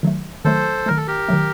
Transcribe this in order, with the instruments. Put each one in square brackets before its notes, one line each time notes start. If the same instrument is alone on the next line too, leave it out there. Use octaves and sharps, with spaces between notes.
[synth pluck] D#3 F#3 A3
[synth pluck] D#3 F#3 A3 [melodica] A4 C5
[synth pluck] D#3 F#3 A3 [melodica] A#4
[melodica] A4
G4 A#4
[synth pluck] D#3 F#3 A3